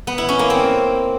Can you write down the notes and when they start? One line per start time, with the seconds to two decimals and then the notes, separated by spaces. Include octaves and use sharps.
0.07 B3
0.18 E4
0.29 C#4
0.39 A#3
0.50 C4